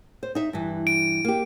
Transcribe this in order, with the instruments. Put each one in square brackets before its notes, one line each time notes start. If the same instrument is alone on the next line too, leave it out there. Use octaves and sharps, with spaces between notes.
[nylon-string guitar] C5
D#4 E5
G2 E3
[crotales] D7
[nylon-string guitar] A#3 G4